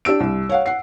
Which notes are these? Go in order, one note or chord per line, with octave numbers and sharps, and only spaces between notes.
D4 G4 E6 D7
C2
C#5 F5 F#5
F#5 C7